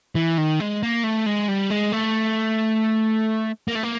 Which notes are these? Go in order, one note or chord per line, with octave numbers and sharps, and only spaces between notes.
E3
D#3
G#3
A#3
A3
G#3
G3
G#3
A3
A#3
A3
A#3